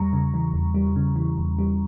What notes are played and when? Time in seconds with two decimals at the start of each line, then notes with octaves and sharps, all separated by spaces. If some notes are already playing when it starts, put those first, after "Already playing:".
Already playing: E2 G3 A#5 C#6
0.13 C#3
0.34 E3
0.54 E2
0.74 G3
0.96 C#3
1.16 E3
1.38 E2
1.59 G3